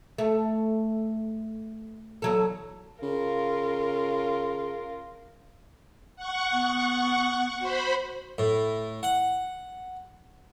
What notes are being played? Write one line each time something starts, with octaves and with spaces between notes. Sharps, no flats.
A3
E2 F#3 A4
C#3 F4 A#4
F#5 C#6
B3
F#4 C5 B5
A2
F#5